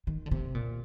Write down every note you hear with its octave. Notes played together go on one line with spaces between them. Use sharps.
D#3
D3
C3
A#2